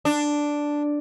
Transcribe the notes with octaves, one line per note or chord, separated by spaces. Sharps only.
D4